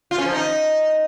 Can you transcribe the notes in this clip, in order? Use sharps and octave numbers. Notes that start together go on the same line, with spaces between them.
F4
C#4
F3
D#4